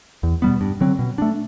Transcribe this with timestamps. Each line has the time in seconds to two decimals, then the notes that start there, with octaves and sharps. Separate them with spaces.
0.23 E2
0.42 B2 G3 B3
0.61 G2
0.81 D3 F#3 C4
0.99 B2
1.18 A3 D4